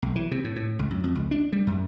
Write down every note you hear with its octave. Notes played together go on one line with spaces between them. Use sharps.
B1
E3
C3
A2
A2
C#2
F#2
F2
C#2
D4
G3
F#2